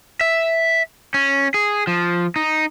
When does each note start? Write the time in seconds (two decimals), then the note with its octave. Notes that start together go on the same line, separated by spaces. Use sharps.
0.21 E5
1.14 C#4
1.54 G#4
1.87 F3
2.36 D#4